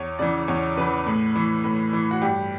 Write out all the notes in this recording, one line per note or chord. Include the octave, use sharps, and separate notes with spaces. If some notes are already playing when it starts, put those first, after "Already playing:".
Already playing: E2 C#5
C#3 E3 D5
E2 C#5
C#3 E3 B4
A2
E3
A2
E3
F#4
G2 G4